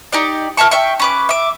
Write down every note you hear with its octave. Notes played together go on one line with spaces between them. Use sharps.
D#4 G4 D5
A#4 E5 A5 C#6
E5 G5 C#6
C#4 B4 D6
E5 D6